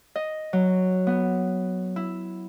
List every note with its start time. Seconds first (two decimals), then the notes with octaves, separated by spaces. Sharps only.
0.16 D#5
0.53 F#3
1.07 B3
1.96 E4